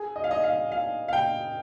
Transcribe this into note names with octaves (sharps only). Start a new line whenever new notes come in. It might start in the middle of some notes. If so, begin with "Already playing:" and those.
Already playing: G#4
D#5
F5
D#5
F5
F5
F5
G5